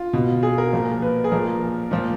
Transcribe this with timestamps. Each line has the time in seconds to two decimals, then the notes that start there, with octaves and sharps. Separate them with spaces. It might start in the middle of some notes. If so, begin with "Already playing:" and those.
Already playing: F4
0.13 B2
0.43 G#4
0.58 A#4
0.73 A#2 F3
1.02 B4
1.24 G#4
1.32 A#2 F3 A#4
1.91 A#2 F3